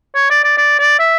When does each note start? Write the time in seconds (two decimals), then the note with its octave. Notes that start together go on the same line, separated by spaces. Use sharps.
0.15 C#5
0.30 D5
0.43 D5
0.57 D5
0.79 D5
0.99 E5